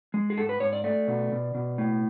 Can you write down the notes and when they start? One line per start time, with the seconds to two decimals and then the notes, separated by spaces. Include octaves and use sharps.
0.14 G#3
0.30 G#4
0.37 G#2 A4
0.49 B4
0.60 G#2 C#5
0.73 D5
0.84 A3 D5
1.08 B2
1.32 B2
1.55 B2
1.78 A2